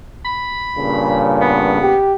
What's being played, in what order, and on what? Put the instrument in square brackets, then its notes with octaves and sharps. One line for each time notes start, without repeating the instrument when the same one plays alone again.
[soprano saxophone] B5
[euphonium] G2 [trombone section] A#2 C#3
[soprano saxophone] B3
[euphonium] G4